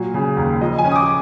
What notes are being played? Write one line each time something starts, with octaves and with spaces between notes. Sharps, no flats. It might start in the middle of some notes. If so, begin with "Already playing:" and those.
Already playing: A#2 F#3
C#3
D#2
F3 D#5
G#5
C#4
D#6
D6